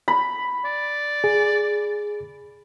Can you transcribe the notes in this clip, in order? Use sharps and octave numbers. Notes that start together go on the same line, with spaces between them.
B5
D5
G#4